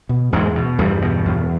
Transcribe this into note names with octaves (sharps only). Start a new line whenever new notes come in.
B2
E2 G#2 G#3
B2
E2 G2 G3
B2
E2